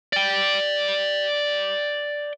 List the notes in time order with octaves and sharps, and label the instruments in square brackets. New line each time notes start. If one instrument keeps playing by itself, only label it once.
[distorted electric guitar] D5 G5